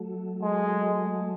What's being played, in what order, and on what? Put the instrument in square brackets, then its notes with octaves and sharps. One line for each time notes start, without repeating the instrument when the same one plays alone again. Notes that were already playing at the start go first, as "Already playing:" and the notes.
Already playing: [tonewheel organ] F#3 A3
[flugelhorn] G#3